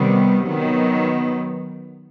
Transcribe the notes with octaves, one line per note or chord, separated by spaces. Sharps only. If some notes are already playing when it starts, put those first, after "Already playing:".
Already playing: C3 D#3 G3 B3
D#3 F#3 B3